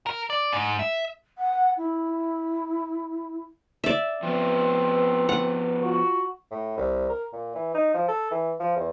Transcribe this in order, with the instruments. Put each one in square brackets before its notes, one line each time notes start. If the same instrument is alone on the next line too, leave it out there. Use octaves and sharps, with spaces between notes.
[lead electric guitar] A#4
D5
G#2
E5
[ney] F#5
E4
[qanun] D5 E5
[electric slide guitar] F3 B3 [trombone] C4 [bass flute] B4
[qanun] F#5
[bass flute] F4 [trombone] F#4
[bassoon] A2
C2
A#4
A#2
E3
D#4
F3
A4
E3
F3
E2